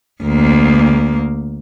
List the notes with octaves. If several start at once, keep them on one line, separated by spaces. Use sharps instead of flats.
D2 A#3